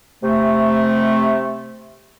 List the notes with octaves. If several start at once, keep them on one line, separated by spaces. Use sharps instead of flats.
C3 A3